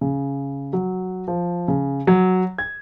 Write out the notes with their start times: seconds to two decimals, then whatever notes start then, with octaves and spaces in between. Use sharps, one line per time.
0.01 C#3
0.73 F#3
1.28 F3
1.68 C#3
2.07 F#3
2.58 G#6